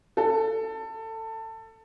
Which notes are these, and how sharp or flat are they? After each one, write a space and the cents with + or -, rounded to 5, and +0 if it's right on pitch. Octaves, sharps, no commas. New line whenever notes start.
A4 +20